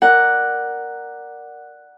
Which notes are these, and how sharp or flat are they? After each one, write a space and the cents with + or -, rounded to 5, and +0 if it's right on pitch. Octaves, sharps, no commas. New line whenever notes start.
A#4 +0 D5 +0 F#5 +0